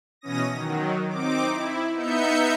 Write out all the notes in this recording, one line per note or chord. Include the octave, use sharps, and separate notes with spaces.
B2 E3 C#4 D#6 A#6
D#3 F#3
C4 D#4 D6
E4
B3 D#4 E5 G6 C#7